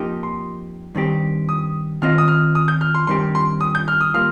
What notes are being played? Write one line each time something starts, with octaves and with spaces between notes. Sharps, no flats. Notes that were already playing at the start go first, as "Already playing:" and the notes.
Already playing: F2 F3 A#3 D#4 G4
C6
G2 D#3 C4 G4
D#6
D#3 C4 F4 D#5 F6
D#6
F6
D#6
G6
F6
C6
G2 D#3 C4 G4 C6
C6
D#6
G6
F6
D#6
D#3 G3 A#3 F4 F6